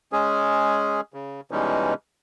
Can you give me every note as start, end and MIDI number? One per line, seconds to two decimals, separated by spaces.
0.13 1.01 56
0.13 1.01 61
0.13 1.01 68
1.14 1.41 49
1.51 1.94 47
1.51 1.94 52
1.51 1.94 55
1.51 1.94 56
1.51 1.94 61
1.51 1.94 63